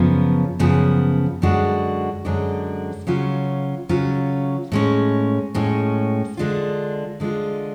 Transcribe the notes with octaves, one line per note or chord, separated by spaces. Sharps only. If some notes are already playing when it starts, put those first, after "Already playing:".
Already playing: F#2 C#3 F3 B3
F#2 C#3 F3 B3
F#2 D3 G#3 D4 F#4
F#2 D3 G#3 D4 F#4
C#3 F#3 C#4 F4
C#3 F#3 C#4 F4
A2 G#3 C#4
A2 G#3 C#4
D3 G#3 D4 F4
D3 G#3 D4 F4